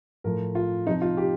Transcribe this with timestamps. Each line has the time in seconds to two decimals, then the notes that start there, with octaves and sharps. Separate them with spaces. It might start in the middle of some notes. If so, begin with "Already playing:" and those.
0.24 A2 F3 A#4
0.55 F4
0.86 C3 F3 D#4
1.01 F4
1.17 G4